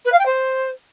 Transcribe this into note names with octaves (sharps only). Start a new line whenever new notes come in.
B4
F5
G5
C5